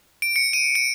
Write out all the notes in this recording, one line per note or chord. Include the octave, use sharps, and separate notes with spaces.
D7
C#7
D#7
D7